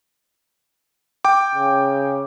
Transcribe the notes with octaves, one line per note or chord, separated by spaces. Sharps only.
G5 D6
C#3